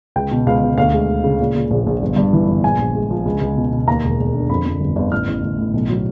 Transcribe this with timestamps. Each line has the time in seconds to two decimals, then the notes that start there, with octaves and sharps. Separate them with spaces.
0.16 C#2 G5
0.31 B2
0.47 C#2 F5
0.62 B2
0.78 D2 F5
0.94 G#3
1.09 G#3
1.24 C#3
1.40 A#2
1.55 A#2
1.71 A#1
1.87 A#1
2.02 G1
2.16 G2
2.33 E3
2.48 G1
2.63 A#1 G#5
2.78 A#1
2.95 G#3
3.10 F3
3.25 C#2
3.41 C#2
3.56 B2
3.72 B2
3.87 D#2 A#5
4.04 E1
4.19 E1
4.34 D3
4.50 F2 B5
4.65 F2
4.81 G1
4.96 G1
5.11 A1 F6
5.28 A1
5.43 A1
5.58 A2
5.74 B1
5.89 F#3